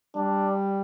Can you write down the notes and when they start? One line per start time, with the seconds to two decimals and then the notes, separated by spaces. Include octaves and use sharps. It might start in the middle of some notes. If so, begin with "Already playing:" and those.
0.16 G3 D4